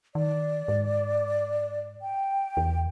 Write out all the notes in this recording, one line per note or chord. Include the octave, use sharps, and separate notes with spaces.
D#3 D5
G#2
G5
E2